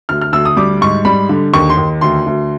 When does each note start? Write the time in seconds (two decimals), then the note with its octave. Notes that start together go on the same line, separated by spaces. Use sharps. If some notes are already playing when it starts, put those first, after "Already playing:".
0.09 D2 F6
0.21 F6
0.33 D2 E6
0.45 D#6
0.57 G3 D6
0.81 G#2 C#6
1.05 G3 B5
1.29 D3
1.54 D#2 C#6
1.70 C6
1.77 D#2
2.01 D2 C6
2.26 D2